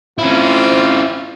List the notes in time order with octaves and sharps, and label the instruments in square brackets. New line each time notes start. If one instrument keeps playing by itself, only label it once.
[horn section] C4 F4 [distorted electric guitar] C#4 E4